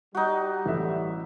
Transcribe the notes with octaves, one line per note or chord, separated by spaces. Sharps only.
G3 D#4 F#4
A1 A4 E5